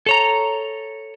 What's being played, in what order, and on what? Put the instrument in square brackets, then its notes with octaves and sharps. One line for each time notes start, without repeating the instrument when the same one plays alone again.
[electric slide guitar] A4 C#5 A#5